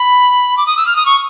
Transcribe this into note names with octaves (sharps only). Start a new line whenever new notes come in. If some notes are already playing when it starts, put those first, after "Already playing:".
Already playing: B5
D6
D#6
E6
F6
D#6
C#6